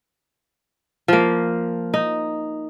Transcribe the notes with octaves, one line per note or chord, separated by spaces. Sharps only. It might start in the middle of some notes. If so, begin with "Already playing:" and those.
F3 A#3
D#4